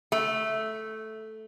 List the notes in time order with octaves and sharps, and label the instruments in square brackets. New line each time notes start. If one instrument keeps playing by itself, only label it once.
[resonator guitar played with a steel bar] A3